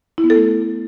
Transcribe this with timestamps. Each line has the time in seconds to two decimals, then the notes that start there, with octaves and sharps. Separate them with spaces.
0.18 E4
0.24 B3
0.30 A4
0.36 A3